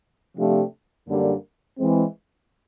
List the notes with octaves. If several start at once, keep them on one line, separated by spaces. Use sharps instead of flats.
C3 F3 A3 D4 G4
F#2 D3 G3 A#3 D4
E3 G#3 C4